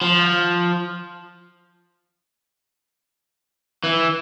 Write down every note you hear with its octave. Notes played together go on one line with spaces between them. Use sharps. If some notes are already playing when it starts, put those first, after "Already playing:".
F3
E3